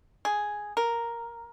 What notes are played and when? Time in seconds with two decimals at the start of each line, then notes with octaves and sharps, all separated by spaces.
0.25 G#4
0.77 A#4